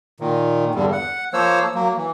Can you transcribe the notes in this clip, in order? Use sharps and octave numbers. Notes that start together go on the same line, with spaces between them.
A#2 D#3
E2 G2 D3 G3
F#5
F3 A#3 C5 C#5 E6
F#3 A#3
E3